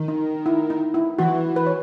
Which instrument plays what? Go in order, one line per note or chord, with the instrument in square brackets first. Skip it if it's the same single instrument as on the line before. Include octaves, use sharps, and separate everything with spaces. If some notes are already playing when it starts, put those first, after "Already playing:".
Already playing: [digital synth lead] D#3
[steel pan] D#4
E4
D#4
E4
[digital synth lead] E3 [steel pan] F#4
[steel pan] B4
C#5